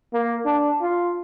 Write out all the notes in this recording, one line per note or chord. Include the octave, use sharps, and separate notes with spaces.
A#3
D4
F4